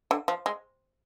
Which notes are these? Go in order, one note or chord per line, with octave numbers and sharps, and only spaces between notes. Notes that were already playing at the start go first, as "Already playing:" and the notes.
D3
F3
G#3